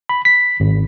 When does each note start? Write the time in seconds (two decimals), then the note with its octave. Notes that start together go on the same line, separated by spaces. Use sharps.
0.09 B5
0.25 B6
0.60 G#1